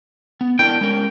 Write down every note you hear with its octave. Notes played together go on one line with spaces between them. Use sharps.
B3
D4 E4 A#4 G5
G#3 C#4 A#4